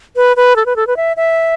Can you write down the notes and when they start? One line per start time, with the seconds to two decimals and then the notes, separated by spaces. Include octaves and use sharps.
0.16 B4
0.36 B4
0.56 A4
0.66 B4
0.76 A4
0.87 B4
0.97 E5
1.17 E5